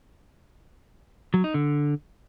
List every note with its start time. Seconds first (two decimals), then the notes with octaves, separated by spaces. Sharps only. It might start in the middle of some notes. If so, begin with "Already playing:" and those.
1.34 F#3
1.44 D#4
1.54 D3